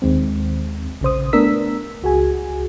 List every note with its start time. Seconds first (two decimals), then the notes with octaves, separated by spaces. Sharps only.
0.02 D#2 D#3 G#3 C4
1.01 A#1 C#3 C5 D#6
1.33 A3 B3 D4 A#4 E6 B6
2.02 C#2 F#4 G#4 G#5